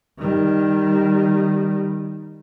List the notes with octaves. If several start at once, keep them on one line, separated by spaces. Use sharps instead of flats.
D#3 G3